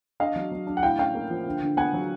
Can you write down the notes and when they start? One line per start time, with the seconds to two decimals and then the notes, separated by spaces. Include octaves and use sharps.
0.20 D4 D#5 F5
0.36 F#3
0.51 F#3
0.67 D4
0.77 F#5
0.83 A2 F5 G5
0.99 C#4 F5 G5
1.15 A#3
1.30 F3
1.46 D3
1.62 D3
1.77 B3 F#5 G#5
1.93 F#3